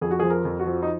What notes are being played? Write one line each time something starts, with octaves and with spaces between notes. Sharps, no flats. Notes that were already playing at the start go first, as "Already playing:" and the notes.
F2 G#4
F#4
F3 G#4
A#4
F2
F#4
F3
D#4